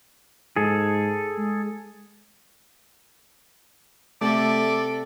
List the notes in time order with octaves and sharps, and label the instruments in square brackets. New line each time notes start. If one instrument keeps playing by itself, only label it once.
[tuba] G#2 [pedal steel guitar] G#4 A4
[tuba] G#3
[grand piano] C3 [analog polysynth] A3 [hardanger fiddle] A4 E5 [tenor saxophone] D5